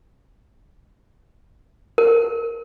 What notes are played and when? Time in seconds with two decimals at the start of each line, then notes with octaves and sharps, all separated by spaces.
1.98 A#4